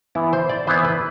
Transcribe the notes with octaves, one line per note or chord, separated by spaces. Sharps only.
E3 B3 E4
C5
D5
E3 B3 E4 C5
B4